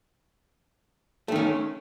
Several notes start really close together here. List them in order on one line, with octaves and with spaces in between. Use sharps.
A3 D#3 C#4